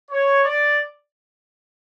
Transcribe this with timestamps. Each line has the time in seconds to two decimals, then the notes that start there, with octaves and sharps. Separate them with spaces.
0.10 C#5
0.45 D5